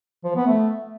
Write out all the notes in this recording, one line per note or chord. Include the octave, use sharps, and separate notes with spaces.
F3
B3
A3